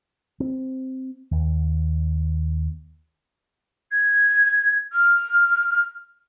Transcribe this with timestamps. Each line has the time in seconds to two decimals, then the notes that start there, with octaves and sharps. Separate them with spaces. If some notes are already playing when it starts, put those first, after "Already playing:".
0.40 C4
1.31 D#2
3.92 G#6
4.92 F6